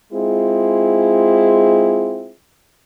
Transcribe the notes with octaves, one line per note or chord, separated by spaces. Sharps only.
G#3 C4 E4 F4 G#4